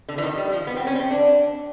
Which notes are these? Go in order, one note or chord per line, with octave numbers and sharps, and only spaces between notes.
D3
E3
D#3
G3
F3
B3
C4
C#4
C4
D4